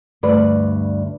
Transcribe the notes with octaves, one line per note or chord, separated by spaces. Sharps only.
D2 G2 B4 D5